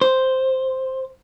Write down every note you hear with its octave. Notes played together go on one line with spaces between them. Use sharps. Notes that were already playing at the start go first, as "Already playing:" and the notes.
C5